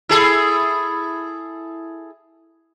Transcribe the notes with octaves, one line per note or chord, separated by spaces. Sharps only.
E4 G#4 A4